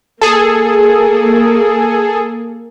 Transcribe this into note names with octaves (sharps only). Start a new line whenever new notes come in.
A#3 G#4 A4